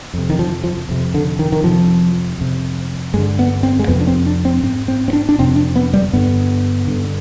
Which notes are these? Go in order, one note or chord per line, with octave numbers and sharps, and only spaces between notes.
F2 C3
D#3
F3
F3
F2 C3
D3
D#3
D#3
F2 C3 F3
F2 C3
G2 D3 G#3
B3
C4
G#3
F2 C3 B3
D4
C4
D4
C4
G#2 C4
C4
C4
D4
D4
F2 C3 C4
D4
B3
G3
G2 D3 B3
G2 D3